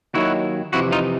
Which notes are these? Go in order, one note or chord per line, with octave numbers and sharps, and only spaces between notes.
D#2 D#3 F#3 E4 F#4
F2 C3 E3 E4 F#4
D#4 F4